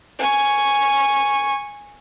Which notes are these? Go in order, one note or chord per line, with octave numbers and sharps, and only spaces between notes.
G#5 C#6